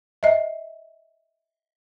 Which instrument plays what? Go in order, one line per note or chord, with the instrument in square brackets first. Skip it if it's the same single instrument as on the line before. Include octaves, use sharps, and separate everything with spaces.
[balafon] D#5 E5